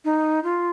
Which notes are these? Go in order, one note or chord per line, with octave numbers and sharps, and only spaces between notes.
D#4
F4